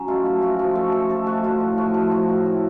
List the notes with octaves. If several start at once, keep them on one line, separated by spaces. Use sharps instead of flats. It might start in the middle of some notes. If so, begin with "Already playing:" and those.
Already playing: F#3 C#4
A3 F4
F3
A3 F#4
F3
A3 A4
F3 A4
A3 A4
A3 F#4
F3 F4
A2
F3 F#4
F3
F3 F#4
A2
A2